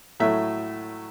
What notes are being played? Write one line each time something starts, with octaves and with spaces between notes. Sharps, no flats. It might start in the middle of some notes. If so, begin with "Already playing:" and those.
A2 F#3 A3 E5